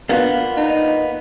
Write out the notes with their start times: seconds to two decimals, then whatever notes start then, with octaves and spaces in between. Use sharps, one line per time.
0.09 A#3 B3 D4 F4
0.57 D#4